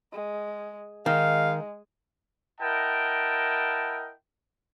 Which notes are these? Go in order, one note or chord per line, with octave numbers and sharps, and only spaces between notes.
G#3
D#3 G#3 F5
E4 A#4 D#5 F#5 G5 A5